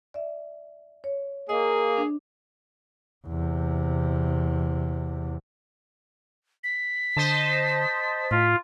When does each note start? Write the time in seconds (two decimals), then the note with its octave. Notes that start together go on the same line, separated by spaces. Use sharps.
0.14 D5 E5
1.04 C#5
1.49 A#3 G#4 D#5
1.97 D4
3.27 E2 C3
6.64 B6
7.17 D3 C5 D#5 A5
8.31 A2 F4